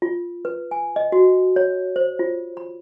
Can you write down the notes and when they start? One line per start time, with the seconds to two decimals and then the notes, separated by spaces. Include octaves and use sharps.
0.02 F4
0.45 B4
0.71 G#5
0.96 D#5
1.12 F#4
1.56 C#5
1.96 C5
2.19 F4
2.57 B5